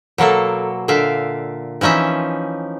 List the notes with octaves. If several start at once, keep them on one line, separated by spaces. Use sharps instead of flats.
B2 F#3 A#3 A4
A#2 D3 E5 F5
E3 F3 C#4 D#4 E5